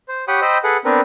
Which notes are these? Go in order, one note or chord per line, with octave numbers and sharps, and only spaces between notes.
C5
G4 C#5 F#5 G5 B5 D#6
C5 D#5 G5 B5 E6
G#4 A4 B4 F#5
B3 C4 D4 A#4 B4